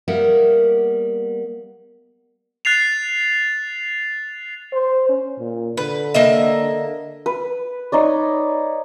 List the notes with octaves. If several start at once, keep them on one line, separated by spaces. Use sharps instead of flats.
G3 A#3 B3 A#4 E5 F#5
F#6 A6 C7 F7
C5
C#4
A#2
D3 B4
A#3 D#5 E5
B4
D#4 C#5 D5